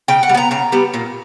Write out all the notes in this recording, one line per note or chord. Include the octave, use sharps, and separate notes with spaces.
C#3 G5
F#5
G3
B3 A#5
C#3 A#5
G3 B3
A#2